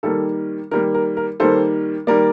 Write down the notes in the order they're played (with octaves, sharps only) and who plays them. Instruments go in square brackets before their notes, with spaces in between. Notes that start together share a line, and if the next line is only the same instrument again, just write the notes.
[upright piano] D#3 G3 A#3 A4
D#3 G3 A#3 A#4
A#4
A#4
D#3 G3 A#3 A4 C5
D#3 G3 A#3 A#4 D5